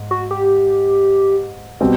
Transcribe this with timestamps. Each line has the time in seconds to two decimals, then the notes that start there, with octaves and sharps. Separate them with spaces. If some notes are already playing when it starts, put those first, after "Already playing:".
Already playing: G#2
0.11 F#4
0.31 G4
1.81 B2 G3 C4